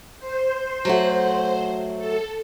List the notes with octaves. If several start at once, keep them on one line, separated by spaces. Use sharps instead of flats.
C5
F#3 A3 F#4
A4